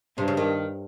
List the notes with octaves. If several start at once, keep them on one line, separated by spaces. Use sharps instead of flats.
G2 C3
C#3
D#3